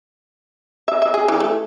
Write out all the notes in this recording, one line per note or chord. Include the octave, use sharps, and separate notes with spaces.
E5
E5
G#4
E3
A3